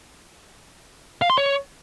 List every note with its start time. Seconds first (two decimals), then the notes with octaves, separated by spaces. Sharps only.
1.22 F5
1.30 C6
1.38 C#5